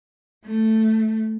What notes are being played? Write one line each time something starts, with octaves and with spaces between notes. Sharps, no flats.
A3